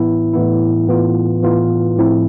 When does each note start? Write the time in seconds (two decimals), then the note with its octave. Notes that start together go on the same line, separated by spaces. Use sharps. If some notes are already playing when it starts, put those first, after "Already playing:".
Already playing: A2 E3 B3 E4
0.33 A2 E3 B3 E4
0.88 A2 E3 B3 F4
1.43 A2 E3 B3 F4
1.98 A2 F3 C4 E4